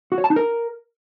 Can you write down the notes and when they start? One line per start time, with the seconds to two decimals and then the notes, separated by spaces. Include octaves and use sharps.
0.12 F#4
0.18 C#5
0.24 A5
0.30 D#4
0.36 A#4